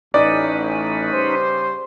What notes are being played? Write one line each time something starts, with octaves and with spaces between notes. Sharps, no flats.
A1 C#4 D#4 B4 D5 D#5
C#3 G3 C5